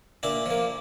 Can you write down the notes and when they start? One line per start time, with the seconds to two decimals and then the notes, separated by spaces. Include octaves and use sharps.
0.23 A#2 D4 E4
0.46 F3 A#3